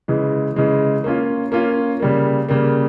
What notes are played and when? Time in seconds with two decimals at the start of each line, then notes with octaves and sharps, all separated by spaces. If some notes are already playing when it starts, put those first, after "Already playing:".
0.08 C#3 E3 G#3
0.56 C#3 E3 G#3
1.04 A#3 C#4 F4
1.52 A#3 C#4 F4
2.00 C#3 G3 A#3
2.49 C#3 G3 A#3